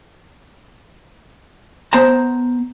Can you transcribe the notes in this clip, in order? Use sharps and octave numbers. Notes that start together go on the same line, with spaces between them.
B3 C5 A5 A#5